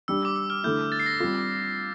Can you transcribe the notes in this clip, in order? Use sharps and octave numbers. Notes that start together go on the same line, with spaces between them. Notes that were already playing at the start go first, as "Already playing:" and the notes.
G3 D4 G4 E6
D6
E6
F6
D3 A3 E4 G6
A6
C7
A#6
G3 C4 F4